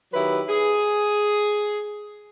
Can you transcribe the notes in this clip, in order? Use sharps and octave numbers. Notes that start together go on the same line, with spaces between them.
D#3 F#3 E4 G4 B4
G#4